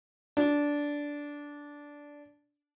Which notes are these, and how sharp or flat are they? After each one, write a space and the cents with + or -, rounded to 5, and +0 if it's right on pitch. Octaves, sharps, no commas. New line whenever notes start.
D4 -10